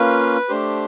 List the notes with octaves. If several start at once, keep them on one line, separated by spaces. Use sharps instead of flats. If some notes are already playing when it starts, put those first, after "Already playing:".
Already playing: A#3 C#4 F4 B4
A3 D4 G4 C5